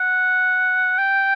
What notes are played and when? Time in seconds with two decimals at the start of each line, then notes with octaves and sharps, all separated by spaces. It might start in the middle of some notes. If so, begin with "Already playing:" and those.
Already playing: F#5
0.99 G5